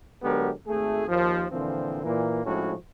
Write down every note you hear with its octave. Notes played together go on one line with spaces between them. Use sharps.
D3 F#3 G#3 B3 G4 A#4
G#1 A3 G#4
D#2 F3
A#2 D3 E3 F3 C4
A#2 E3 A#3
A2 F3 G#3 C#4 D4 F#4